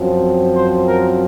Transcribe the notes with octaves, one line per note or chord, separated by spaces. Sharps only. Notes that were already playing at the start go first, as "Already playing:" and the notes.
Already playing: F#2 F3 C4
C5
A#4